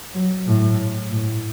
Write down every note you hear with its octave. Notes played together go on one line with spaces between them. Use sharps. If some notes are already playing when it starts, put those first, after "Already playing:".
F#3
A2
A2